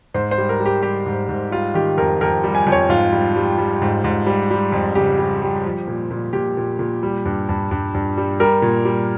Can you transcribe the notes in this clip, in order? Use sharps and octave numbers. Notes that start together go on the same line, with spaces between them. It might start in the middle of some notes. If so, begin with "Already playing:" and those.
G#2 C5
C5
G3
A#4
G3
G4
G3 G4
G#2
G#2
G3 F4
D#3 G4
F2 A#4
F2 A#4
G3
G#5
F2
C#5
G#2 F4
G3
G3
G3
G#2
G#2
G3
G3
F2
C#3 G4
G3
G3
F3
A#2
A#2
A#2 G4
A#2
A#2
G3
G2
G2
G2
G2
G3
G3 A#4
A#2
G3